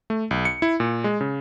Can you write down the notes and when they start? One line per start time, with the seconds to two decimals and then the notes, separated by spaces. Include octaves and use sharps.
0.10 A3
0.31 B1
0.45 C#7
0.62 E4
0.80 A#2
1.04 G#3
1.21 C#3